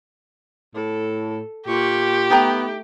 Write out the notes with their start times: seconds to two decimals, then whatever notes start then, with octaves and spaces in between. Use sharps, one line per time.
0.75 A2 A4
1.68 A#2 G4 C#6
2.30 A3 B3 D#4 G5 A#5